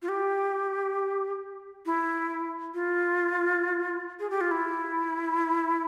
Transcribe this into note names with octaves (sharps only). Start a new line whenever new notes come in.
F4
G4
E4
F4
G#4
G4
F4
E4